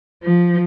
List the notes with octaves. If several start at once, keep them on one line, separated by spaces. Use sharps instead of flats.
F3